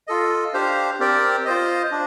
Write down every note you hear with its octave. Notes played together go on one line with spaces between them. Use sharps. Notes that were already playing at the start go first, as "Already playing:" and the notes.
F4 A4 D#5
D4 G4 C5 F5
C4 G4 A#4 D5 G5
F4 C5 D#5
D4